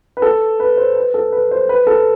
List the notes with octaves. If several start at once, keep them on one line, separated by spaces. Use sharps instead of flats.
B4
A4
B4
C5
B4
A4
B4
C5
B4
A4